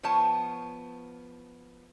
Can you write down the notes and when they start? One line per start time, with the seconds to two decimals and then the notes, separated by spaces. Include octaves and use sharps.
0.03 F3 B3 C#5 A5